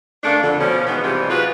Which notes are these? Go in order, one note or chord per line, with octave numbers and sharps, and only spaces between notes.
C#3 A3 A#3 D4
F2 D3
B2 F3 C#4
D#3 E3 G#3 B3
G#2 C3 E3 F3 G3 G#3
F#3 F4 F#4 G#4 B4